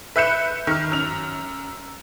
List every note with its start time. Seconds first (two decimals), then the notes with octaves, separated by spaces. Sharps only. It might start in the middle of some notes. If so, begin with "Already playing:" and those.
0.16 B4 E5 F#6 G6 C#7 E7
0.67 D#3 F6
0.92 F#2 F7